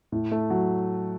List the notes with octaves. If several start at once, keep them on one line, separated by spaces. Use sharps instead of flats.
A2
A3
F#3